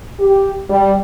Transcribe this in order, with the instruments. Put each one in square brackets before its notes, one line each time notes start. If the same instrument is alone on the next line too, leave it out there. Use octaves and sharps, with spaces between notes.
[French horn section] G4
G3